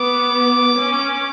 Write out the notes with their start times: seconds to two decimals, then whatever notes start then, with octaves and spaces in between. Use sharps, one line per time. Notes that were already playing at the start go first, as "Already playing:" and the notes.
Already playing: B3 D6
0.77 C#4